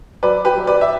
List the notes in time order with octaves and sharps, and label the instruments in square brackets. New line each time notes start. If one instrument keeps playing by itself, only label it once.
[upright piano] F#3 B4 D5
G4 B4
F#3
B4 D5
E5